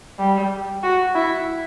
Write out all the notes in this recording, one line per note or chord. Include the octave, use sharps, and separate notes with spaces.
G3
F#4
E4